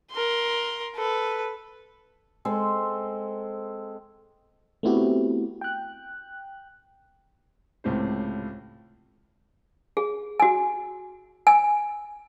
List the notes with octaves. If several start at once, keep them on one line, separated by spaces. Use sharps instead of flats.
A#4 C6
A4 B4
G#3 C4 A4 C5
A3 B3 C4 E4 F#4 G4
G5 F#6
C#2 A2 C3 C5
G#4
F#4 G#5
G#5